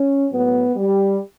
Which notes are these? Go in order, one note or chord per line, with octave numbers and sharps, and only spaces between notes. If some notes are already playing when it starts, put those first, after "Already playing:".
Already playing: C#4
A2 F#3 B3
G3